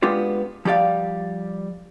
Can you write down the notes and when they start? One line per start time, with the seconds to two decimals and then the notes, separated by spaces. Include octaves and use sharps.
0.02 G#3 B3 D4 F4 G4
0.65 F3 G3 G4 D5 F5